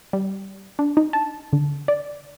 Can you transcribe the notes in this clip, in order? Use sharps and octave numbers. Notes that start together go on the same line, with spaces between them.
G3
D4
D#4
A5
D3
D5